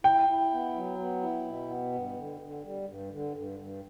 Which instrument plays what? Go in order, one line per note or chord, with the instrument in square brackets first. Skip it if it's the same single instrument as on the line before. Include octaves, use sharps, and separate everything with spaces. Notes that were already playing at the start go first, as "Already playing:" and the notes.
[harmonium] E4 [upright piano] G5
[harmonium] E4
B3
F#3
B3
E4
B2
B3
G2
D3
D3
G3
G2
D3
G2
G2